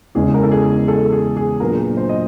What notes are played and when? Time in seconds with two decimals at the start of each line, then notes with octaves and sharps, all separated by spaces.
0.15 E2 C#3 E3 G#3 C#4 G#4
0.34 A#4
0.43 A4
0.51 G#4
0.88 A4
1.12 G#4
1.36 G#4
1.60 A#2 F#3 B3 D4 A#4
1.97 C5
2.09 D#5